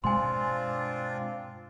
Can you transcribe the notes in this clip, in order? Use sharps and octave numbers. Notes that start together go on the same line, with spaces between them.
G2 B2 G#3 C4 D4 F4 G#5 C6